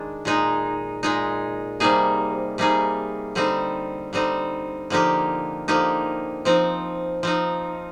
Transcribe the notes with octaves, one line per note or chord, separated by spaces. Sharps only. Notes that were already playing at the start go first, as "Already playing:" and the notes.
Already playing: D#3 G#3 D4
A#2 G#3 D#4
A#2 G#3 D#4
C3 G3 A#3 D#4 G#4
C3 G3 A#3 D#4 G#4
D3 G3 C4 D#4
D3 G3 C4 D#4
D3 F3 A#3 D#4 G4
D3 F3 A#3 D#4 G4
F3 C4 D#4
F3 C4 D#4